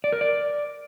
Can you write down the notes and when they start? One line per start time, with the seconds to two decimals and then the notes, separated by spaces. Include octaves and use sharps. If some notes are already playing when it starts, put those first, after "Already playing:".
0.04 D5
0.12 A#4
0.21 D5